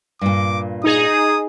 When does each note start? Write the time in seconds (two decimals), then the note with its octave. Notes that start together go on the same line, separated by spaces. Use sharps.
0.21 G2 A#2 D6
0.84 D#4 G#4 D#6